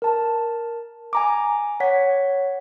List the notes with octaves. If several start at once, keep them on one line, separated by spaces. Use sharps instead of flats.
A#4 A5
G#5 A#5 D6
C#5 F#5 B6